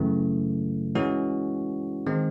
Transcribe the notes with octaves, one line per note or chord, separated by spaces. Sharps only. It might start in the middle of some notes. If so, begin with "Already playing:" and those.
Already playing: F#2 C#3 E3 A3
E3 G#3 C#4 F#4
D#3 G#3 C4